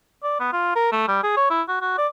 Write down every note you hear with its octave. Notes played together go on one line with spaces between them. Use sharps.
D5
B3
F4
A#4
A3
G3
G#4
C#5
E4
F#4
F#4
D5